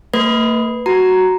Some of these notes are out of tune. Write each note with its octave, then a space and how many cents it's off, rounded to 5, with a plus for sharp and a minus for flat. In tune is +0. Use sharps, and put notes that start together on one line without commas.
A#3 -45 B4 +0
F#4 +0 A#5 +0